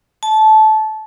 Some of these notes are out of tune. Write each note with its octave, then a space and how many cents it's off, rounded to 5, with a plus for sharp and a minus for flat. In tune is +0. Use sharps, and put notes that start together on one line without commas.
A5 -20